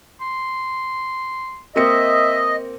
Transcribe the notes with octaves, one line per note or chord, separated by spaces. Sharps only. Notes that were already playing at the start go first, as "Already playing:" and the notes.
C6
A#3 C4 D#5 E5 C#7